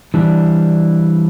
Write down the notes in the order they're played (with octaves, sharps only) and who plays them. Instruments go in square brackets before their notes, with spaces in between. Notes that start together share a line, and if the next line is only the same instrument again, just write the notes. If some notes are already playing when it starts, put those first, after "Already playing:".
[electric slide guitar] E3 G3 D4